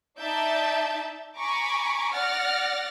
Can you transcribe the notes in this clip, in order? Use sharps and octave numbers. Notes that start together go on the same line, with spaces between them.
D#4 D5 E5 A5 G6 A6
G#5 A#5 B5 C#6 D6
D5 F#5 F6 A6 A#6